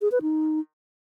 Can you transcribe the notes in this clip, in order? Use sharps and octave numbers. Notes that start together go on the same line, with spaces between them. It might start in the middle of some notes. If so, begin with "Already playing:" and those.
G#4
B4
D#4